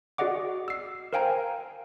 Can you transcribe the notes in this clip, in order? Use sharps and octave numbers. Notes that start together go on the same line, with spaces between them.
F#4 G#4 D5 D#5 F#5 D6
E6 C7
A#4 C5 F5 G5 G#5 A#5